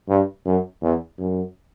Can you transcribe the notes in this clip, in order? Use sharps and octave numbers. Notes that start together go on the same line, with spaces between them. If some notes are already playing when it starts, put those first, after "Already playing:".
G2
F#2
E2
F#2